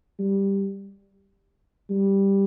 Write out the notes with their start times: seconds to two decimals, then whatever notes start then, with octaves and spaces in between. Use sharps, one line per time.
0.19 G3
1.90 G3